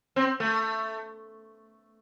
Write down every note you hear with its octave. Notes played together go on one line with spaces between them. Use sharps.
C4
A3